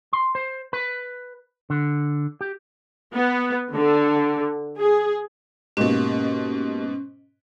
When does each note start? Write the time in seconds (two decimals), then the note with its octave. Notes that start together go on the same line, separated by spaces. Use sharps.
0.13 C6
0.35 C5
0.73 B4
1.70 D3
2.41 G4
3.14 B3
3.76 D3
4.79 G#4
5.77 G#2 B2 A#3 C#4 G4